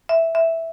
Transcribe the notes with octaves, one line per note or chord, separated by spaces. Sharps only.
E5
E5